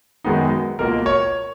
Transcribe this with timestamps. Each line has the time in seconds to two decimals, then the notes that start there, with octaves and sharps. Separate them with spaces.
0.24 F#2 D#3 G#3 B3 D#4
0.79 C#2 B2 A#3 F4 A#4
1.06 C#5